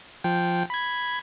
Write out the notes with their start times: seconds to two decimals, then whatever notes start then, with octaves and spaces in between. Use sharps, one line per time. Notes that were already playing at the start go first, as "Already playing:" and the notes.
0.24 F3 G5
0.70 B5 G#6